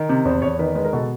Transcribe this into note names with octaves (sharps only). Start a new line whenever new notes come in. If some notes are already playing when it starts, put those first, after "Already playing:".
Already playing: D#3
C3
E2 C5
E2 C#5
D#3 B4
G#3 B4
A#4
B2 A4